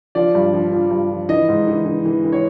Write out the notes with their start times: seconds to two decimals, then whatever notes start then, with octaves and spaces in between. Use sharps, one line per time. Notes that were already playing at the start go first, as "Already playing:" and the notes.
0.15 F3 D5
0.35 G2
0.54 F3
0.72 F3
0.91 G2
1.11 F3
1.29 E3 D#5
1.49 G#2
1.67 E3
1.86 E3
2.05 E3
2.24 E3
2.32 C#5